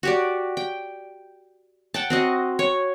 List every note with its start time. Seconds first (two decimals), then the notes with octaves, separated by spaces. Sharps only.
0.03 F#4 G4 D5
0.57 G5
1.94 F#5 G5 A5
2.10 C4 F#4 D#5
2.59 C#5